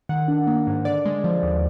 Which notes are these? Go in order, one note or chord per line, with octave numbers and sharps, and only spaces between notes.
D#3 F#5
D4
A#3
G#2
D3 D5
G#3
F3
D#2